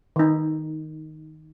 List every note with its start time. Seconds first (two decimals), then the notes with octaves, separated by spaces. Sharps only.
0.16 D#3 D#4